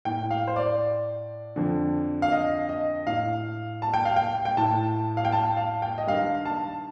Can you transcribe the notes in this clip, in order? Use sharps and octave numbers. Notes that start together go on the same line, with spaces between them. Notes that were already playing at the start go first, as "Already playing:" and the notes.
A2 G5
F5
C5
D5
F2 D3
F5
D#5
D#5
A2 F5
A5
G5
F5
G5
G5
A2 A5
F5
G5
A5
F5
G5
D#5
G2 D#3 F5
A5